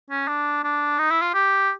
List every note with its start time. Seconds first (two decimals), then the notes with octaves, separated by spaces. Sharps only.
0.10 C#4
0.28 D4
0.64 D4
0.99 D#4
1.11 E4
1.22 F4
1.34 G4